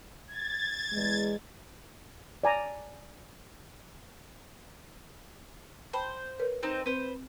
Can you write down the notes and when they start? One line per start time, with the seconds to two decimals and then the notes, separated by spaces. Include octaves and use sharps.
0.28 G#6 A6
0.92 E2 G#3
2.44 D5 G#5 A#5
5.93 C5 G5 A5 B5
6.40 A#4 B4 C#5
6.63 C4 D#4 C5
6.86 C4 B4 C5